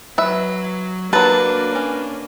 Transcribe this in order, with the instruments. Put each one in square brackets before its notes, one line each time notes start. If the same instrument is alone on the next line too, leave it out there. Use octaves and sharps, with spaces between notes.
[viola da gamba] F#3 [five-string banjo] B4 E5
[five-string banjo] F#3 A5 [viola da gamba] A#3 D4 [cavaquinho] B4
[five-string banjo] C#4